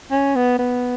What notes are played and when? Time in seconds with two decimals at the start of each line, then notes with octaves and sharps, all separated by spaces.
0.11 C#4
0.35 B3
0.59 B3